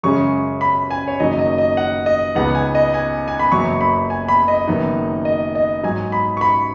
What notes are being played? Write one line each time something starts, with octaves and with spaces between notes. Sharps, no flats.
F#2 C#3 G#3 C#4 C#6
B5
G#5
C#5
F#1 F#2 D#3 F#3 D#5
D#5
D#5
F#5
D#5
C#2 C#3 B3 D#4 F#5
G#5
D#5
G#5
G#5
B5
F#1 F#2 F#3 B3 C#6
B5
G#5
B5
D#5
F#1 F#2 D#3 B3 D#4
D#5
D#5
G#2 F#3 D#4 G#5
B5
C#6
B5